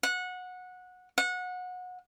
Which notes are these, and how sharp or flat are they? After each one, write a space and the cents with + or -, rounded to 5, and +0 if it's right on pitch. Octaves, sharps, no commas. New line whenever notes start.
F#5 -20
F#5 -25